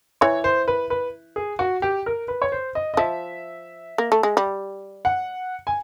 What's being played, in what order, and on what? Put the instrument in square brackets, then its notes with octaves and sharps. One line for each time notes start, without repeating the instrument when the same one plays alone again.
[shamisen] E3 [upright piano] C#5
[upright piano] C5
B4
B4
G#4
F#4
G4
A#4
B4
C#5
C5
D#5
D#5
[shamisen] F3 [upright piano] E5
[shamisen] A#3
A3
G#3
G3
[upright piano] F#5
G#5